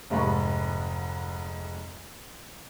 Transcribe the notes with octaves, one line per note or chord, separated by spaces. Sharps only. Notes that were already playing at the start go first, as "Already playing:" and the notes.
F1 G#2 B5 C#6